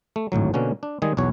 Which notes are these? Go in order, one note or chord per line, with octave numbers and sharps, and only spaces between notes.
A3
G#1 D2 A2 F#3
B2 D3 A#3 C#4 F#4
D4
D#3 G3 G#3 G#4
B1 E2 F#4 C#5